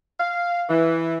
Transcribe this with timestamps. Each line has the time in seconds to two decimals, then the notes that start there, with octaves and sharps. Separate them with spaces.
0.20 F5
0.69 E3